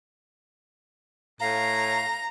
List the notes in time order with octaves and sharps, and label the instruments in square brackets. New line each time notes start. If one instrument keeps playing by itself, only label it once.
[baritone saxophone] A2 [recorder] F5 [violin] A#5